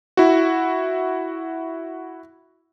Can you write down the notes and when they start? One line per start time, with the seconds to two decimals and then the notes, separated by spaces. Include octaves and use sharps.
0.17 E4 F#4